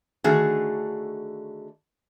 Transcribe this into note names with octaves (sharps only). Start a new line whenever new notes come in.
D3 D#3 A3 F#4 G#4